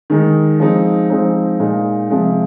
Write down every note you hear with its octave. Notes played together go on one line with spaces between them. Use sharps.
D#3 G#3 D#4
F3 G#3 C4 D#4
F3 G#3 C4 D#4
A#2 G#3 D#4
C3 F3 G#3